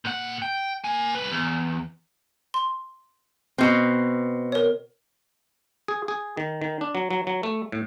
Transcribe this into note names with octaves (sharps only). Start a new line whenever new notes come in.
A#2 F#5
G5
A#3 G#5
C2 B4
E2
C6
B2 C4
A#4 C#5
G#4
G#4
D#3
D#3
D4
F#3
F#3
F#3
A3
A2